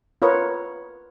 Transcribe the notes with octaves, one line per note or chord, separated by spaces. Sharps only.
F4 A#4 B4 C#5